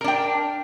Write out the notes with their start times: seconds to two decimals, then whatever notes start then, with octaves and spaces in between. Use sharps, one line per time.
0.01 A#4
0.04 D4
0.08 G5